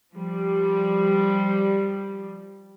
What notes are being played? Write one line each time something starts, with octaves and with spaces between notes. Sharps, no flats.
F3 G3